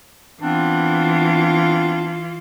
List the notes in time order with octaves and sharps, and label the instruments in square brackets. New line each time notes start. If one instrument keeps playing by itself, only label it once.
[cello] E3 F4 [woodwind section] B3 C4 D4